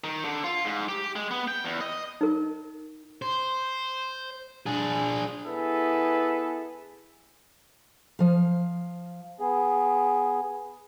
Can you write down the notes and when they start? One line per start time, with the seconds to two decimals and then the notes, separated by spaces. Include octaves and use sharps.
0.04 D#3
0.25 D3
0.44 F4
0.65 G#2
0.89 G4
1.16 G#3
1.31 B3
1.48 G5
1.64 E2
1.81 D#5
2.21 D#4 A#4
3.22 C5
4.66 D4 G#4
5.45 B3 E4 G#4 A4 B4
8.19 F3 F5
9.40 B3 G#4